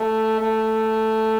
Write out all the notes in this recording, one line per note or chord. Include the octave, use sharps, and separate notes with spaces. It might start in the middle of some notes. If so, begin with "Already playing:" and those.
Already playing: A3
A3